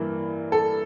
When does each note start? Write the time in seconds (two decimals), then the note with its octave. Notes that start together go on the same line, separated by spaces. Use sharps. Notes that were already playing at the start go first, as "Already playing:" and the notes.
Already playing: G2 E3 A#3
0.52 A4